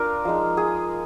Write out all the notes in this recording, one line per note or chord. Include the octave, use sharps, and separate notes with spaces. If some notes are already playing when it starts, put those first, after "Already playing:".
Already playing: D4 F4 A#4
F3 G#3 D#4
G#4